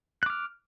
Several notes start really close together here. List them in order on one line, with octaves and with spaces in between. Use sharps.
F#6 D6 F6